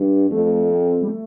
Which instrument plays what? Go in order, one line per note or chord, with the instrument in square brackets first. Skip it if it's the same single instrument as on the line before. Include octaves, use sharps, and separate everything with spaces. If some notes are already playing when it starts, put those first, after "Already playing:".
Already playing: [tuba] G2
[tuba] F2 [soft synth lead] A3
[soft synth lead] C4
G3
A3